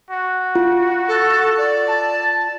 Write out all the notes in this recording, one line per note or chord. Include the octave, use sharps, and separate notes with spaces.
F#4
F4
A4
D5
A5